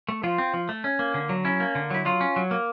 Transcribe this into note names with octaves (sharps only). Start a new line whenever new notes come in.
A3
F3 F4
C4
F3
A3
C#4
A#3
D3
F#3
C#4 E4
A#3
D3
F#3 E4
F#3 F4
C#4
F#3
A#3